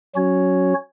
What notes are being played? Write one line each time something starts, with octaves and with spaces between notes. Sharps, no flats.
F#3 C#4 F#4 C#5